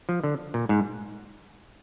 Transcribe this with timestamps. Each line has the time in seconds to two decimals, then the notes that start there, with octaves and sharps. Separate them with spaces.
0.09 F3
0.24 D3
0.54 A#2
0.69 G#2